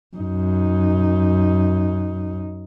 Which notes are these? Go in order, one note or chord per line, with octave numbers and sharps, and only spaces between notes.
F#2 D#4